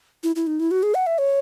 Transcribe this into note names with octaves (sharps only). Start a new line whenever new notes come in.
E4
E4
D#4
E4
F#4
G#4
F#5
E5
C#5